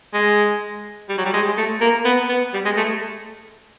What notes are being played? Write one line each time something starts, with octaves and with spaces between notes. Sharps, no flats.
G#3
G3
F#3
G3
G#3
A3
A#3
B3
B3
G3
G#3
A3